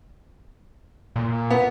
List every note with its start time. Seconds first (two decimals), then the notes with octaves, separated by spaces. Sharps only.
1.16 A#2
1.50 B3